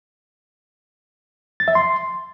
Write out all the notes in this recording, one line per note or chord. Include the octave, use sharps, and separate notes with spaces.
A6
E5
C6